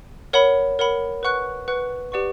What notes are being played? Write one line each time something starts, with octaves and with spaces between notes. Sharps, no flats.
A#4 C#5 F#5 B5
A#4 C#5 F#5 B5
B4 F#5 C#6 F#6
B4 F#5 C#6 F#6
G4 B4 D5 F#5 C#6